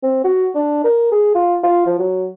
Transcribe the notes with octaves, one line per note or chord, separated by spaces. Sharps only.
C4
F#4
D4
A#4
G#4
F4
F4
F3
F#3